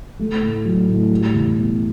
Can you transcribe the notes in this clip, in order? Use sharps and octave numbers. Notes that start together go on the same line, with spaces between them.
A3
A2
F#3
A2
G3
E2
B2